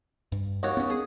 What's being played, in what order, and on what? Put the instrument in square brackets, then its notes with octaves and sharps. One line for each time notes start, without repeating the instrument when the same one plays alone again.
[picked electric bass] G2
[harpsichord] D#2 F#4 C#5
[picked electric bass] B3 C#4
[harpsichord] G#4